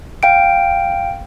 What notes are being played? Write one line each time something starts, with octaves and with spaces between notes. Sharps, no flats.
F5 G5 D7